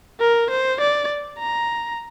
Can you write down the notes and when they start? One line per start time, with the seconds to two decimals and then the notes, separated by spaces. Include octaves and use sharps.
0.20 A#4
0.51 C5
0.80 D5
1.40 A#5